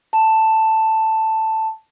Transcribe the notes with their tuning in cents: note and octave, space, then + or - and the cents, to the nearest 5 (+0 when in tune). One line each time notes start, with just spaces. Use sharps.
A5 +5